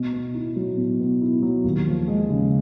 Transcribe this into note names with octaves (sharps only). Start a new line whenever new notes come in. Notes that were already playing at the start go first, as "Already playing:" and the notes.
Already playing: B2
B3
E4
F#3
B2
B3
E4
F#3
D#2
F3
G#3
C#3